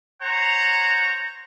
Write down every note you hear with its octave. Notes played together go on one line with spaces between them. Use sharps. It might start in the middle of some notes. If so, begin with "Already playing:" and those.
C5 C#5 F#5 A#5